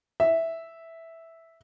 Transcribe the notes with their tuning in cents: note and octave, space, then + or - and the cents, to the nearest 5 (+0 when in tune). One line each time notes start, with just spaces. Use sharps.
E5 -5